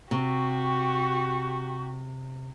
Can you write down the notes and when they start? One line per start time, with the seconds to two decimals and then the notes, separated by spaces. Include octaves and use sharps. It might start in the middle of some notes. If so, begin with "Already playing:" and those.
0.11 C3 F#4 G4 C#6